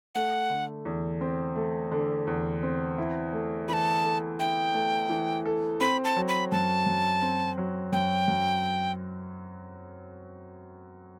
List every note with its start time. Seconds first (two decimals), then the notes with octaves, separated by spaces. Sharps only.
0.15 A3 F#5
0.50 D3
0.85 E2
1.21 C4
1.56 A3
1.91 D3
2.27 E2
2.63 C4
2.98 E4
3.33 A3
3.68 E3 A5 B5
4.04 A4
4.40 E4 G5
4.74 A3
5.10 E3
5.45 A4
5.81 C4 B5
6.04 A5
6.16 F#3
6.28 B5
6.51 F#2 A5
6.86 F#2
7.22 C4
7.58 F#3
7.92 F#2 G5
8.28 F#2